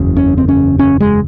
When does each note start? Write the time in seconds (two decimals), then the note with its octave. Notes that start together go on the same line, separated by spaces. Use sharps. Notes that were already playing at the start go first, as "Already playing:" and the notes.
Already playing: F#1 E2 C#3
0.17 C#4
0.38 C4
0.48 C#4
0.79 C#4
1.00 G#3